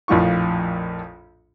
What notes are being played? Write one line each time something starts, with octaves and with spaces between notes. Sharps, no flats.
A#1 F2 A2 F4 C#6